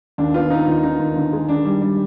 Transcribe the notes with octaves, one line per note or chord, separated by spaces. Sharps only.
D#2 D4
B3 F4
B3 D#4
D#2 F4
D#2 D#4
D#2
D3
G#3
D#3 D4
G3
G3